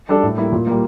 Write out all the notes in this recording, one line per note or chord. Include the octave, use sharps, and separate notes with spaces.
G3 D4 A4 D5
A2
G3 A#3 E4
A#2
G3 A#3